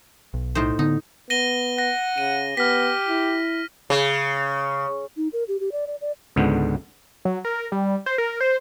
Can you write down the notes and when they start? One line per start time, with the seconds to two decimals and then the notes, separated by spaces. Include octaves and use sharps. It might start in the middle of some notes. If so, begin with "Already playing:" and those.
0.34 B1
0.55 A2 D#4 C5
0.79 D3 B3 D#4
1.30 B3 A#6 D#7 G7
1.78 F#5 A#6
2.18 C#3 D#7
2.57 B3 G4 F6 B6
3.07 E4
3.90 C#3
5.17 D#4
5.33 A#4
5.48 G4
5.60 G4
5.72 D5
5.87 D5
6.01 D5
6.36 C#2 G#2 D3 B3
7.25 F#3
7.45 A#4
7.72 G3
8.06 C5
8.18 A#4
8.41 C5